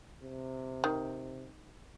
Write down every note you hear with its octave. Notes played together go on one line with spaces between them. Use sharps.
C3
D#3